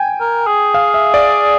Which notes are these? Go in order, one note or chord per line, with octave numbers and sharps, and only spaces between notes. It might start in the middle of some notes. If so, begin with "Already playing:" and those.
Already playing: G5 G#5
A#4
G#4
F5
E5
D5